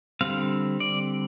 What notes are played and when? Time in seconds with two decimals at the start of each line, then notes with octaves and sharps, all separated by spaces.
0.21 D3 G3 C4 F5
0.80 D5